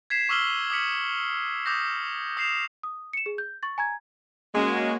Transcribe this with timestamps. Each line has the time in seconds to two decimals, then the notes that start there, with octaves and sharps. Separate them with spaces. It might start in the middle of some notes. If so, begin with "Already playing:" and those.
0.10 G#6 B6 C7 E7
0.29 C#6 D6 E6 F6 F#7 G7
0.70 D6 D#6 F6 B6 C#7 F#7
1.66 D6 D#6 G6 A#6
2.37 D#6 G6 C7 E7 F7
2.83 D#6
3.13 C#7 E7
3.26 G#4
3.38 G6
3.63 C#6 A6
3.78 G#5 A#5 G#6
4.54 G#3 A#3 C#4 F#4